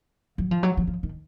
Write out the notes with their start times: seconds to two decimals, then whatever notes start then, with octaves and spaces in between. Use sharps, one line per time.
0.38 F#3
0.51 F3
0.63 F#3
0.77 F#3
0.87 F3
1.03 D#3